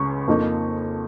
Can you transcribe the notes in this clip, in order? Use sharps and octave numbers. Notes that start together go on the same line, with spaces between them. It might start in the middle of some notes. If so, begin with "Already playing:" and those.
Already playing: C#2 C#3 G#3 C#6
F2 F3 A#3 D#4